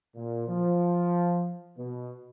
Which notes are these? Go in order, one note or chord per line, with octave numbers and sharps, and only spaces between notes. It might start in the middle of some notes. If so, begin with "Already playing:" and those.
A#2
F3
B2